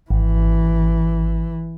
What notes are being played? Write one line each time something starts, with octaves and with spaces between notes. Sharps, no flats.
G#1 E3